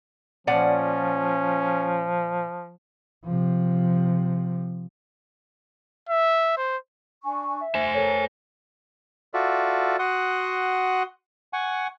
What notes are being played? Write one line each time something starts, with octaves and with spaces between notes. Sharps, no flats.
A#2 F3 C#4 D5 F#5
C3 F3
E5
C5
D4 G#5 C#6
E5
C5 G#5 C6
A4 A#4 C#5
F4 F#4 A4 D5 E5
F#4 F#5 C6 D#6 F#6
F#5 G#5 C#6